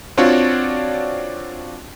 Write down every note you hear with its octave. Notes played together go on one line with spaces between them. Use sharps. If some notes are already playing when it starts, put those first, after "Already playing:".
C4 D4 F4 F#4 C#5 D5